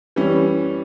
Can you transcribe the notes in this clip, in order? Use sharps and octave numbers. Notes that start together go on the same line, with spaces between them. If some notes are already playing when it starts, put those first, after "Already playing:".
E3 G3 C#4